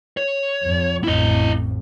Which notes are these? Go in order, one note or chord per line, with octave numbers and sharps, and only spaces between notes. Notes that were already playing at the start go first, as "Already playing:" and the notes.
C#5
F2
A1 F2 A2 E4 D#5